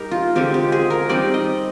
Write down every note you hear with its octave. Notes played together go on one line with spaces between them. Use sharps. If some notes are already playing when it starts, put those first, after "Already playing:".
Already playing: G3 D#4 G4 A#4
F4
D3 G#3 C4 G4
G4
G#4
A#4
G3 C4 D#4 D5
D#5